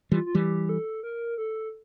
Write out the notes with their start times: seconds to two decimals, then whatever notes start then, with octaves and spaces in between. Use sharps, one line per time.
0.12 E3 G3 F4
0.26 F4
0.35 E3 G3 G4
0.69 A4
1.03 A#4
1.38 A4